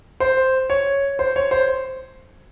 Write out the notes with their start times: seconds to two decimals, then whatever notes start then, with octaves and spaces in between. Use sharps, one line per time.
0.20 C5
0.70 C#5
1.19 C5
1.36 C#5
1.51 C5